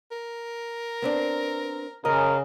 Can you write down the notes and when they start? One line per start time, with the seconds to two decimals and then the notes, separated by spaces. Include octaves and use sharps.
0.11 A#4
1.02 B3 C4 D4
2.05 C#3 A#4 D#5